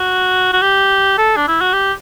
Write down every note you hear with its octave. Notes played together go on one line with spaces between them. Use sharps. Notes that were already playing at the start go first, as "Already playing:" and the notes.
Already playing: F#4
F#4
G4
A4
D4
E4
F#4
G4